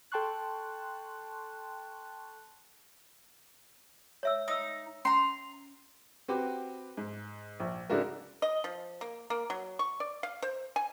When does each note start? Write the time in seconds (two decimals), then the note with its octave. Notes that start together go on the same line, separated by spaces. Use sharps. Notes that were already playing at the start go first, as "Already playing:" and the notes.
0.12 A4 G5 A5 C6 C#6 F#6
4.23 C#5 E5 E6
4.48 D#4 D#6 E6
5.05 C#4 A#5 C6
6.28 C4 F#4 G4 B4
6.97 G#2
7.60 A#1
7.90 C#3 G#3 D4 E4 F#4 A#4
8.42 D#5
8.64 F3
9.01 A#3
9.30 A#3
9.50 F#3
9.79 C#6
10.00 D5
10.23 F5
10.42 C5
10.76 G#5